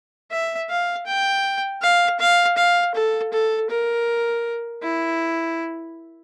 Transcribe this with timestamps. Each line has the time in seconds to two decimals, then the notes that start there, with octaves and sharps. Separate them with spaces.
0.31 E5
0.70 F5
1.07 G5
1.82 F5
2.20 F5
2.57 F5
2.95 A4
3.33 A4
3.70 A#4
4.83 E4